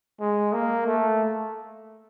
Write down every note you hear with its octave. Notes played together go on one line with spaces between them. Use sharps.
G#3
A#3
A3